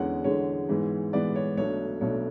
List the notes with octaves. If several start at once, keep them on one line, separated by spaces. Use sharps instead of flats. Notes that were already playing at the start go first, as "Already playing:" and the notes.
Already playing: E2 D3 G#3 C#4 F#5
E2 D3 G#3 C#4 C#5
G#2 E3 G#3 B3
G#2 E3 G#3 B3 D5
C#5
B1 B2 A3 D4 C#5
B1 B2 A3 D4 C#5